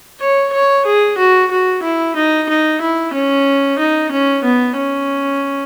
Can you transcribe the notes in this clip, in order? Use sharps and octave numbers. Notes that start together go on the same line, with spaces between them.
C#5
C#5
G#4
F#4
F#4
E4
D#4
D#4
E4
C#4
D#4
C#4
B3
C#4